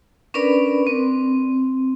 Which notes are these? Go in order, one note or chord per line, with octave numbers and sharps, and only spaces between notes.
C#4 D4 A#4 B4 D5 B5
C4